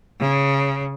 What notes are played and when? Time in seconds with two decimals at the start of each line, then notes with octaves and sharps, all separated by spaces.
0.20 C#3